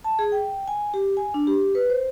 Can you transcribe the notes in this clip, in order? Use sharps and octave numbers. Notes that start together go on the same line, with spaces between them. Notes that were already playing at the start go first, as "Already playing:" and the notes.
A5
G#4
G5
G#5
G4
G#5
D4
G4
B4
C5